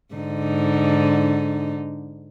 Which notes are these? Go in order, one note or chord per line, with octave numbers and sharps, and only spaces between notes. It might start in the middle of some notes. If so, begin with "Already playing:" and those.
G#2 D3 D#4